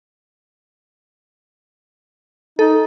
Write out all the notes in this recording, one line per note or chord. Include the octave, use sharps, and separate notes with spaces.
D#4 A4